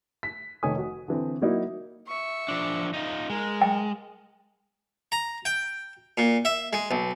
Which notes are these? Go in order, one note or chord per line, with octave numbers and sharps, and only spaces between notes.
B6
F1 D#3 A3 C#5 G#5 D#6
F#4
D3 E3 C4
F#3 A#3 D#4 E4 F#4
E5 C#6
F3 D4
D#4 F4
G#3 A#4
G5
A#5
G5
A#2
E5
G#3
B1